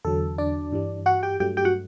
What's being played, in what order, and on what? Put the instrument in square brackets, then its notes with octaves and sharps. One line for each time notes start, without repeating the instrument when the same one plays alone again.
[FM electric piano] E2 D3 F#3 A4
D4 D5
G2 E3 G3
F#4 F#5
G4 G5
G2 F#3 A3 G4 G5
G4 G5
F#4 F#5